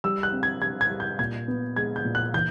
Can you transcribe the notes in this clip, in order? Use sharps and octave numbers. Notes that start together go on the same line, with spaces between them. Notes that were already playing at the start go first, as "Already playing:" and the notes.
G3 E6
F#6
C4
G#6
G3 G#6
G#6
G3
G6
A#2 G#6
B3
G#3 G#6
G6
A#2
F#6
E3 G6